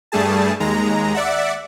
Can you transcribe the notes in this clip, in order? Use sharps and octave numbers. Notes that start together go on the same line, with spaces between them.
G2 G3 A3 G#4 A5
D#2 G#3 A#5
D5 E5 F#5